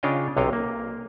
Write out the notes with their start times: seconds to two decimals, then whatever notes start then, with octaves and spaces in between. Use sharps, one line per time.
0.03 C#3 D4 F4 C#5 D#5 G5
0.37 B1 C3 C#5 D#5 F5 G5
0.53 A#3